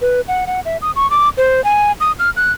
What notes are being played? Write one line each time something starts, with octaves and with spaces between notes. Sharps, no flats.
B4
F#5
F#5
E5
D#6
C#6
D6
C5
G#5
D#6
F6
F#6